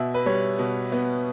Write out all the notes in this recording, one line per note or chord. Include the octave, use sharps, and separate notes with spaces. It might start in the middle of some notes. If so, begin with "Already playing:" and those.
Already playing: B2 E5
B4
G3 C#5
B2
B3